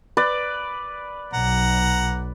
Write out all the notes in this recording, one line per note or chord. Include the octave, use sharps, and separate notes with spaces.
B4 D5
B1 F#5 A#5